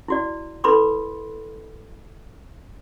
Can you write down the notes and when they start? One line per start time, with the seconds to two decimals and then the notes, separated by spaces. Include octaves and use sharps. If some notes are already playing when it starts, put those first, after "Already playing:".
0.08 E4 F#4 D5
0.64 E4 A4 B4 B5 C6 D6